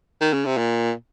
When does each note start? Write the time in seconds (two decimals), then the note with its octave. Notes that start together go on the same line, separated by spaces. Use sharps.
0.21 D#3
0.33 C#3
0.45 C3
0.58 A#2